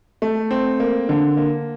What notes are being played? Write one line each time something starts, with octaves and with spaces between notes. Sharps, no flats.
A3
C4
A#3
D3
A#3